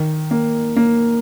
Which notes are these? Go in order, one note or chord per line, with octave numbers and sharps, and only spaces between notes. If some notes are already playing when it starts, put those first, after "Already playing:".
Already playing: D#3
A#3
A#3